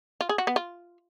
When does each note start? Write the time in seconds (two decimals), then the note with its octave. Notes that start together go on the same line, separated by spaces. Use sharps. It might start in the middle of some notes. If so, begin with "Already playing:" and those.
0.21 F4
0.29 G#4
0.38 F#4
0.47 B3
0.56 F4